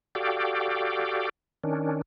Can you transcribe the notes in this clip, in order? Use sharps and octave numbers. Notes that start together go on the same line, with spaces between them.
F#4 G4 A4 D5 F5 G5
D#3 C#4 D4